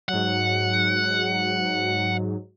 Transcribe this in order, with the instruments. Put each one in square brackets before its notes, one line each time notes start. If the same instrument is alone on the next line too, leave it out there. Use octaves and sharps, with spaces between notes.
[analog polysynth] G#2 F#3 [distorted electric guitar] F#5